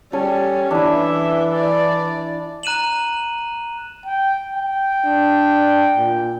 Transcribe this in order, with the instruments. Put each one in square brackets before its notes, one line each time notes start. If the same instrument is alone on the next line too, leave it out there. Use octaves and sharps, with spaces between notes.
[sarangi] G3 [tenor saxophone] C#4 [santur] A4
[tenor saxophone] E3 [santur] D4 E4 [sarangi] E5
[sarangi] D5
[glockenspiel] A#5 F#6 D#7 E7 F#7
[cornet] G5
G5
[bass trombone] D4
A#2